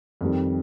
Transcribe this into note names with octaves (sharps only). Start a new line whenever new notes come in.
F2 D#3 G3